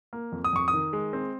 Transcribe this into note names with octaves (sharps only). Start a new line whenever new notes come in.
A#3
F2
D#6
F2 C#6
D#6
D#3
G#3
C4